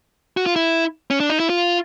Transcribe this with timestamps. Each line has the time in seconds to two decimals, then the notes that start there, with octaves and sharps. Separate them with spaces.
0.37 F#4
0.46 F4
0.56 E4
1.11 C#4
1.20 D4
1.30 D#4
1.40 E4
1.50 F4